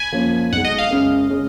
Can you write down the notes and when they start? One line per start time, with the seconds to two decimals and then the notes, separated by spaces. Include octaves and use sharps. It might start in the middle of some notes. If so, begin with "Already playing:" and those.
Already playing: G#5 B5
0.12 F#2 F3 A#3 C#4
0.52 B1 B2 G#3 D#4 F#5
0.65 D#5
0.78 F5
0.91 F#2 C#3 G#3 C#4
1.30 C#3 G#3 C#4